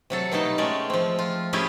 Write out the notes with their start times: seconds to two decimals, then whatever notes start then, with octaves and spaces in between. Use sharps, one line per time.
0.10 C3 F#3 A4
0.32 B2 G3 A3 D#4 A5
0.58 G#3 A3 C#4 D5
0.90 F3 C4
1.19 F4
1.53 A3 C#4 E4 F4 G4 G#4